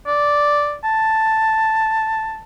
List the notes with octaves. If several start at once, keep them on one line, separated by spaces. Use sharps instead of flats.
D5
A5